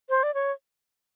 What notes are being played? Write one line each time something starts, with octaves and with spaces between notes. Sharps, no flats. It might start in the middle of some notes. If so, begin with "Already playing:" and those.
C5
D5
C#5